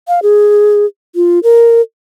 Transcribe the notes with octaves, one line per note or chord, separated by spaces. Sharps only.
F5
G#4
F4
A#4